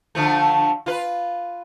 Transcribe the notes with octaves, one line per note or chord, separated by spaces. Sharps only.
D3 F3 A3
F4 B4